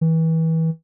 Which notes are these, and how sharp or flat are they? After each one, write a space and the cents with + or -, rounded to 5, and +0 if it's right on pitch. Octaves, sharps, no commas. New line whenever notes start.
E3 -30